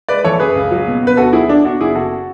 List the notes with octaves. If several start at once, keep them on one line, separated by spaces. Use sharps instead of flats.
G#3 B4 D5
E3 A4 C#5
F#2 G#4 B4
C#2
F#3
B2
B3 B4
D2 F#4 A4
F#3 E4 G#4
D3 D4
B3 D4 F#4
F#1 E4 G#4
C#3 F#4 A4